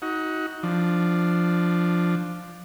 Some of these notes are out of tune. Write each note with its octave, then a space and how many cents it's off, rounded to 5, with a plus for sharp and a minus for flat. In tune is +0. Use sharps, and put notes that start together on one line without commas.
D#4 +25 F#4 +0
F3 +0 D4 +5